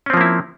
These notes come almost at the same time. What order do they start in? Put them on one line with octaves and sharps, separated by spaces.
C#4 C4 F3 A#3 E4